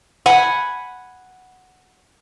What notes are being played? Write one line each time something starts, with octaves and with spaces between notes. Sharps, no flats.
F#5 G#5 B5